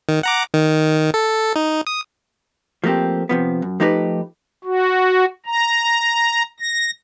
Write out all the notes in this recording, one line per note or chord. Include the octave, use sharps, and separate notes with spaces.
D#3
F#5 A#5 D6
D#3
A4
D#4
D#6
F3 A3 A#3 C4 G4
C3 F3 B3
F#2
F3 A3 D#4 G4 G#4 B4
F#4
A#5
A#6